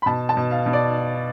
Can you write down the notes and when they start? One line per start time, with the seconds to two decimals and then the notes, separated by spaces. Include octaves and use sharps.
0.02 B5
0.06 B2 A5
0.29 A5
0.37 B2
0.51 F5
0.66 B2
0.73 D5